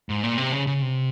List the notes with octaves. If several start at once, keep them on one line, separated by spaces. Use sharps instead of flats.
G#2
A#2
C3
C#3
C#3
C3